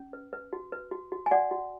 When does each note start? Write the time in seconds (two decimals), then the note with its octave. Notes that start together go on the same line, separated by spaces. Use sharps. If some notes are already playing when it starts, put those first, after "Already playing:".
Already playing: C#4
0.13 B4
0.33 B4
0.53 F#4
0.72 B4
0.91 F#4
1.12 F#4
1.26 G#5
1.31 F#4 D5 F#5
1.51 F#4